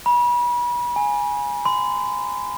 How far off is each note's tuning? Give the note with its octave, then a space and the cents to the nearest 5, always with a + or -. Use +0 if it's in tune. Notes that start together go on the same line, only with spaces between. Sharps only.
B5 -35
G#5 -5
C6 -40